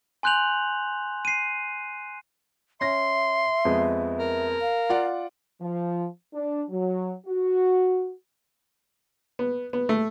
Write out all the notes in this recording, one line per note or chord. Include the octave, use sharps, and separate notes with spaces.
G#5 C6 F#6 G6 F7 F#7
C7 D#7
C#4 E5 C6 A#6
F2 G#3 B3
A#4
F5
F4 D5 F#5
F3
D4
F#3
F#4
B3
B3
A3